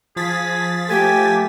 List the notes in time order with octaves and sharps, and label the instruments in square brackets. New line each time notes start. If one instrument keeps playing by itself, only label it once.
[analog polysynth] F3 A6 B6 [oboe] G#4
[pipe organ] A3 [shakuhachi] G4 [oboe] G#5